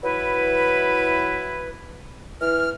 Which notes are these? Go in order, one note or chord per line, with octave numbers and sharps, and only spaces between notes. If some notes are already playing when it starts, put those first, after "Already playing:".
E3 F#3 E4 B4
E3 F6